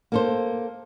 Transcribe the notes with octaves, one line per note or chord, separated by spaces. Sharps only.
A#3 A4 C5